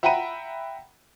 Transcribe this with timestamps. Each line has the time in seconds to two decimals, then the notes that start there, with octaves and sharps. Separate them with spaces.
0.03 E5 F#5 G5 A#5 B5 D#7